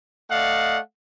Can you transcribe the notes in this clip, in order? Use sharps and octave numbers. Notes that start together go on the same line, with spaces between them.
A3 D5 D#5 F5 F#5